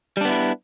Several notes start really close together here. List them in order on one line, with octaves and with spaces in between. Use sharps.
G3 D4 B3 E4